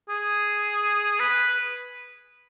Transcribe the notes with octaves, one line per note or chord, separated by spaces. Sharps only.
G#4
B4